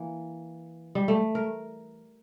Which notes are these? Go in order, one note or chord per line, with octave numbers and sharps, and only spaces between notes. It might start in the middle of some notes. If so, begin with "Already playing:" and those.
Already playing: E3 A#3
G3
A3
A#4